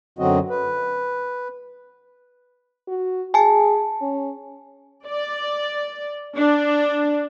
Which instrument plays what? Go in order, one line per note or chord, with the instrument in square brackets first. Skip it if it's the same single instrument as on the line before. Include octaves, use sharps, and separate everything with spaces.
[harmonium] F#2 D3 F#3 C4 F#4 D#5
B4
[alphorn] F#4
[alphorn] G#4 [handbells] G#5 A5
[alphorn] C#4
[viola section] D5
D4